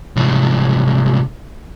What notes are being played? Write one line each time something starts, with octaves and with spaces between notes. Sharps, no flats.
C2 G#2